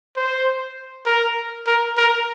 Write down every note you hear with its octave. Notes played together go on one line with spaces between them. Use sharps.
C5
A#4
A#4
A#4